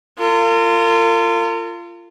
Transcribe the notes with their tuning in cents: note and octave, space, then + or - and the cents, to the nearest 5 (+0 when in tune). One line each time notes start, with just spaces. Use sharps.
F4 -20 A#4 -45